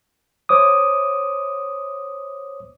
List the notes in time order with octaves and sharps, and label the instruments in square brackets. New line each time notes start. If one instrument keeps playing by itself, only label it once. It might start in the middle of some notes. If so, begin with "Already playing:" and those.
[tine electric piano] C5 C#5 D6 D#6